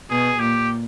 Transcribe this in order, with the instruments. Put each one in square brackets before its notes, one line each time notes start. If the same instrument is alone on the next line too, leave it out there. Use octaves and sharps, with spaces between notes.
[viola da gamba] B2 [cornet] G#4
[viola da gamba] A#2 [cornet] G4